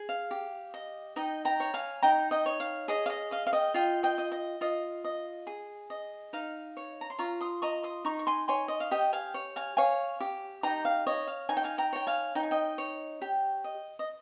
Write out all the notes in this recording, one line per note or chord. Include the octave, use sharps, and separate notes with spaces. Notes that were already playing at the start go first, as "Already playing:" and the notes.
Already playing: G#4
F5
G4
D#5
D#4 D#5 G5
G5 A#5
C#5
F5 G#5
D#4 G5 A#5
D#5 G5
C#5
F5
G#4 D#5
F5
D#5
D#5 F5
F5
D#5 G5
F4 D#5 G5
D#5 G5
D#5
D#5
F4 D#5
D#5
G#4
D#5
D#4 F5
C#5
A#5
C6
F4 A#5 C#6
C6 D#6
D#5 A#5 C#6
C6 D#6
D#4 A#5 C#6
C#6
G#5 C6
C#5 G#5 C6
D#5
F5
G4 D#5 G5
F5 G#5
C#5
F5 G#5
C#5 F5 G#5
G4
D#4 G5 A#5
F5
C#5 D#5
F5
D#4 G#5
G5
F5 G#5
G5 A#5
C#5 G5
F5 G#5
D#4 G5
G#5
D#5 G5
C#5
G4
D#5
D#5